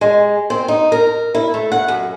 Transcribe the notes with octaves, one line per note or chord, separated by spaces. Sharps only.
G#3
C4
D#4
A#4
E4
A3
F#5
F#2